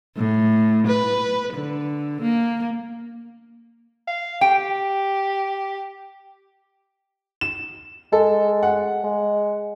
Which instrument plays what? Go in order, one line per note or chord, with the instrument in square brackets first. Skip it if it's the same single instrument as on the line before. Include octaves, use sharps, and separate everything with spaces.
[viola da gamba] A2
B4
D3
A#3
[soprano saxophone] F5
[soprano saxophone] G4 [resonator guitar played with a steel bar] G5
[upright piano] E7
[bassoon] G#3 [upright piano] A4
[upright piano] F#5
[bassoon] G#3